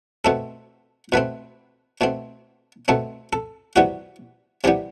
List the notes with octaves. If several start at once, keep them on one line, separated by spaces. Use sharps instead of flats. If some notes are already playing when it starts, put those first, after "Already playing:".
B2 A3 C4 A4
B2 A3 C4 B4
B2 A3 C4
B2 A3 C4 A4
A4
C3 E3 G3 B3 F#4
C3 E3 G3 B3 G4